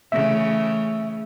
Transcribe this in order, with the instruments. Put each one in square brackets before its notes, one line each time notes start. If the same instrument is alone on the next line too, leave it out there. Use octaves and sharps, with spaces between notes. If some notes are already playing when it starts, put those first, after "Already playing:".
[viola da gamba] C#3 E3 A3 [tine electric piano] E5